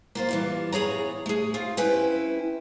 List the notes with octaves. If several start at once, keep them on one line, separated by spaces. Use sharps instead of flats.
A#3 F4 C5
E3 G3 F4
E2 G#4 C#5 A#5
A3 G#4
C4 F4
C4 C#4 E4 B4 G5